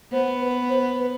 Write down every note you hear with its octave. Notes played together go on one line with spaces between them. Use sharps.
B3 C5
B4
C5
B4